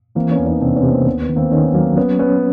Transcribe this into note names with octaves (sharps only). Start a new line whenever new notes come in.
E3 A#3 C4
B3 C#4
E2
C#4 D#4
C3 C4 D4
B3 C#4
C3
A#3 C4
D#2 B3
B3
D#3
A#3 C4
D#3 B3 C#4
F#3 A#3
B3 C#4
B3 C#4